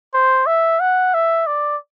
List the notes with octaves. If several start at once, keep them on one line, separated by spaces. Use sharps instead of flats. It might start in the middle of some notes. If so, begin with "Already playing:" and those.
C5
E5
F#5
E5
D5